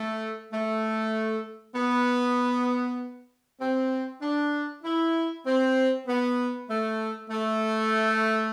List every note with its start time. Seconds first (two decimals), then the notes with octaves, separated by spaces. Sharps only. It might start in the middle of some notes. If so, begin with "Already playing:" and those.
Already playing: A3
0.52 A3
1.75 B3
3.60 C4
4.22 D4
4.84 E4
5.45 C4
6.07 B3
6.69 A3
7.30 A3